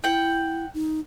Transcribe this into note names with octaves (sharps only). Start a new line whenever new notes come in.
E4 F#5 G5
D#4